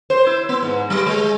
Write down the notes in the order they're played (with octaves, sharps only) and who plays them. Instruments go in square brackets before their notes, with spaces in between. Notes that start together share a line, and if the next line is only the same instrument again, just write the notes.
[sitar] C5
E4
B3
G#2
G3
G#3